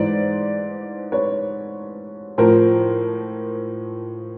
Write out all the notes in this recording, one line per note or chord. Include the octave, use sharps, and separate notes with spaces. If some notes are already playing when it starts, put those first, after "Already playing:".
Already playing: G#2 E3 C5 D5
B4 C#5
A2 F3 A#4 C5